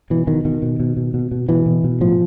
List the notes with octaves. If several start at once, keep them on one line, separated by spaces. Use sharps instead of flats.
B2 E3
B2 D#3
B2 D#3
B2
B2
B2
B2
B2
B2 E3
B2
B2
A2 F3